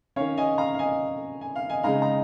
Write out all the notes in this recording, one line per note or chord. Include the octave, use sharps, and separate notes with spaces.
D#3 C#4 C#5 F5
D#5 G#5
F5 A#5
F5
D#5 G#5
G#5
F5
D#5 G#5
C#3 G#3 D#4 F5 A#5
A#5